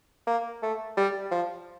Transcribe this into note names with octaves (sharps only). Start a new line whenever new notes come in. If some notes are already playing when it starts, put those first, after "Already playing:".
A#3
A3
G3
F3